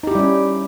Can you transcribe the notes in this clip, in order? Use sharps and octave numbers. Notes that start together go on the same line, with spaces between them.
G3 C#4 D#4 E4 G4